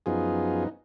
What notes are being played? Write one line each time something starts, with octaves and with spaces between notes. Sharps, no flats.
F#2 F3 B3 D#4 F4 G#4